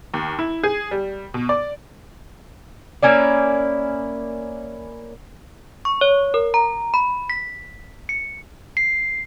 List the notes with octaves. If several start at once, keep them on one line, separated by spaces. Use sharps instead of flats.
D#2
E4
G#4
G3
B2
D5
A#3 C#4 E4 D5
C#6
C#5
A#4
A#5
B5
B6
C#7
C7